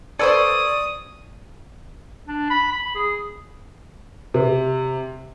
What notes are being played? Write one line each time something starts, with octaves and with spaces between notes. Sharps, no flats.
A4 B4 C5 D5 C#6 D#6 E6 G#6
D4
B5
B5
G#4
C3